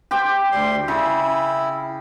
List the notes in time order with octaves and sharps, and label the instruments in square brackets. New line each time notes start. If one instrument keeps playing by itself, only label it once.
[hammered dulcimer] G4 C5 G5
[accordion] D2 G3 C6
[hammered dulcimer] C#3 [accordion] E4